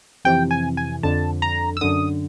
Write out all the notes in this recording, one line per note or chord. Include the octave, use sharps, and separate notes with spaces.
F2 C3 E3 G5
G#5
G#5
F2 D3 A5
A#5
E6
F#2 D3 D#6